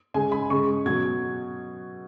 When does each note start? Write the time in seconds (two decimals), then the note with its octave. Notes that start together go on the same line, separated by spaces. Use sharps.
0.14 C#3 G#3 G#5
0.32 B5
0.50 C#3 G#3 C#6
0.86 B2 F#3 G#6